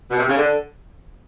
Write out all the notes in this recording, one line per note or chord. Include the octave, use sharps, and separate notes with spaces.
B2
C3
C#3
D3